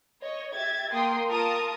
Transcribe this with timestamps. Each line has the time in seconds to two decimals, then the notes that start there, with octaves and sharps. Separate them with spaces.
0.22 C#5 D#5
0.54 G4 E5 G#6 A6
0.91 A#3 A#4 G5 C6 D#6
1.29 F4 A#4 A5 A#5 D#6